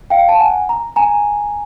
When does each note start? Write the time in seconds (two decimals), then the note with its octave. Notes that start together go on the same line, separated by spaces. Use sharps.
0.10 F5 G5
0.29 A5
0.40 F#5 G#5
0.69 A#5
0.96 G#5 A#5